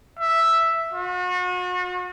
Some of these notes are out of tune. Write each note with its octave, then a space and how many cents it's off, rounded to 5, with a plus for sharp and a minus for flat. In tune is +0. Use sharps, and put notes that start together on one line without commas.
E5 +0
F#4 -40